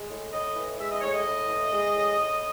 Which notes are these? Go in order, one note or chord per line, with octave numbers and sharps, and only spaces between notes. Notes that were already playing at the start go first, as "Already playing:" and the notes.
Already playing: G#3
A2
A2 D#5
E3
G#3 E5
D#5
A2 C#5
D#5
A2
E3
G#3
A2
A2